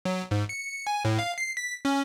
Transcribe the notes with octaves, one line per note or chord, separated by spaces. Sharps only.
F#3
G#2
C#7
G#5
A2
F5
C7
B6
C#4